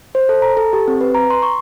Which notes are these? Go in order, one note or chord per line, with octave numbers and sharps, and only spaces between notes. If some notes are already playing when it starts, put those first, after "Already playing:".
C5
A4
A#5
A4
G4
C4
B4
A#5
C6
C#6